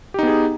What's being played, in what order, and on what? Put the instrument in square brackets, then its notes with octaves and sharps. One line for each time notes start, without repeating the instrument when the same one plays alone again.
[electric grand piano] G4
D#4
B3
G#4